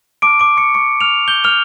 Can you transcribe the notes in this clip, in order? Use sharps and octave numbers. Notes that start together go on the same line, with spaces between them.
A5 C#6 D6 F6 D7
D6 D7
C#6 C#7
C#6 C#7
F6 F7
G6 G7
F6 F7